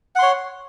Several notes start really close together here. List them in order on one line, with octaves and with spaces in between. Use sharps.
F#5 C6 C#5